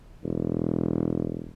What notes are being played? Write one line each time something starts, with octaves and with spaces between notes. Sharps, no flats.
E1